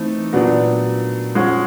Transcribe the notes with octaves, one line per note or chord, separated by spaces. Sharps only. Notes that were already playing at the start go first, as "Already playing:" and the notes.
Already playing: E3 A3 C4 D#4
A#2 F#3 B3 D4
F3 G#3 C#4 F#4